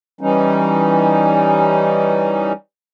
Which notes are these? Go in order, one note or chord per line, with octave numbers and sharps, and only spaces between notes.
E3 G3 C#4 D#4